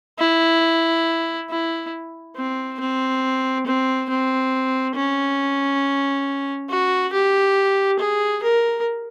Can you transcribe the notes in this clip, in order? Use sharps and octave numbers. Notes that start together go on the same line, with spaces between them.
E4
E4
C4
C4
C4
C4
C#4
F#4
G4
G#4
A#4